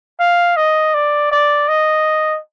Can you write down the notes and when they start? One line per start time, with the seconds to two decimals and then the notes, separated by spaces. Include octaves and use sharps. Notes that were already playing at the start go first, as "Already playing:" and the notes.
0.20 F5
0.57 D#5
0.94 D5
1.31 D5
1.68 D#5